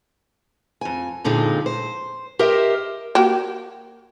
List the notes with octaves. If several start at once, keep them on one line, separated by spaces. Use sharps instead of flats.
F2 G#5
F2 A#2 D3 G#3 D#4
C5
G4 A#4 C5 D#5 E5
A#3 F#4 G4